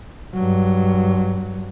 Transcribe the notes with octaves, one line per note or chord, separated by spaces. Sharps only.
G2 F#3